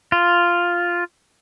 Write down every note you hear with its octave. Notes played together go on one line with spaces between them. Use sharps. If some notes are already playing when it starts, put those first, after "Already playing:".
F4